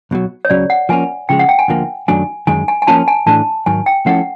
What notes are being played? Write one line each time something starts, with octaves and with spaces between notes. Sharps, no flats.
B1 B2 F#3
C#5
C#2 C#3 F#3 D5
F#5
F3 A#3 C#4 G#5
C#3 F3 G#3 G5
F#5
G5
G#5
D2 D3 F3 A#3
F#2 D#3 F#3 A3 D4 G#5
F#2 D#3 G#3 G#5
G#5
G#5
F3 A#3 C#4 F4 A5
G#5
A2 E3 A3 D4 A5
G#2 D#3 F#3 G#5
G5
F3 A3 C#4 E4 A4 F#5